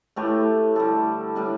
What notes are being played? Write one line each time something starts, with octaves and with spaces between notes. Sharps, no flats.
A2 A3 G4 B4
D3 G3 E4 A4
A2 G3 D4 B4